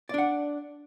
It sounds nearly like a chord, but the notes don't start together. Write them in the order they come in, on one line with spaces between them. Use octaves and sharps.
D5 D4 F#5